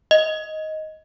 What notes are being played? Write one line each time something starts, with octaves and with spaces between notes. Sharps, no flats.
D#5